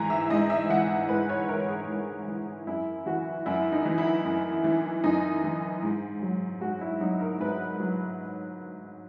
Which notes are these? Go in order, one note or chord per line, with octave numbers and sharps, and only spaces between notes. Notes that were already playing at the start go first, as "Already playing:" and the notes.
Already playing: G#2 E3 G#5 A#5
E5
G#2 D#5
E5
E3 F#5
G#2 B4
C#5
E3 A#4
G#4
G#2
E3
F#2 E4
E3 F#4
F#2 E4
D#4
E3
E4
F#2
E3
F#2 D#4
E3
G#2
F#3
G#2 F#4
E4
F#3 D#4
A#4
G#2 B4
F#3